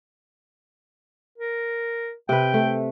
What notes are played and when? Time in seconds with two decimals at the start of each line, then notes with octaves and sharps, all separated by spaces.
1.38 A#4
2.29 C3 B4 G5
2.54 A3